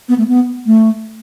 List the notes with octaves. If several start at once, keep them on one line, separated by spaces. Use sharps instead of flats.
B3
A3
B3
A3